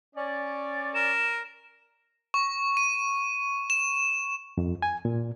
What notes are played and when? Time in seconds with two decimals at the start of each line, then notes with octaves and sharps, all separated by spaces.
0.15 C#4 D5
0.95 A#4 E7
2.34 C#6
2.77 D#7
3.70 E7
4.58 F2
4.82 G#5
5.05 A#2